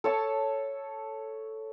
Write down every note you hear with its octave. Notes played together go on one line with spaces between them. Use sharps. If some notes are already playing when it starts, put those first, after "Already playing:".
A4 C#5 A5 E6